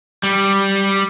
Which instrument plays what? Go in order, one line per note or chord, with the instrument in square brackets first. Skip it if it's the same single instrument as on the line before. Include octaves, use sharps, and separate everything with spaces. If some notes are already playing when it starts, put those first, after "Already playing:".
[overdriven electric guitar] G3